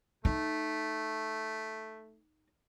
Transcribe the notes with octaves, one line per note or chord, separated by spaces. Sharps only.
A3 D#4